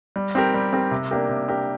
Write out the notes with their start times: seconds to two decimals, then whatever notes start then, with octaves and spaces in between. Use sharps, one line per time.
0.16 G3
0.35 C4 G4 A#4
0.54 G3
0.73 C4 G4 A#4
0.91 C3
1.11 A#3 D4 G4 A#4
1.29 C3
1.49 A#3 D4 G4 A#4